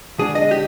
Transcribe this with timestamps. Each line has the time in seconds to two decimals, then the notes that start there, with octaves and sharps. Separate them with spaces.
0.19 D3 G#3 D4 G#4
0.35 D#5
0.51 G4